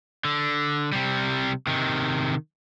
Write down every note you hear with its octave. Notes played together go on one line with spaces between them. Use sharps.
D3
C3 G3
C3 D#3